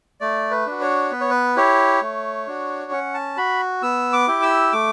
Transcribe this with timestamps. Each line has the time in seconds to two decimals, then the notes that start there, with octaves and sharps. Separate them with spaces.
0.21 A3 D5
0.51 B4
0.66 D4 F#4
0.81 C#5
1.11 B3 B4
1.21 C#5
1.31 B4
1.56 E4 G4 C#5
2.02 A3
2.47 D4 F#4
2.92 C#4 F#5
3.14 A5
3.37 F#4 B5
3.82 B3 E6
4.13 D6
4.28 E4 G4
4.42 E6
4.73 A3 D6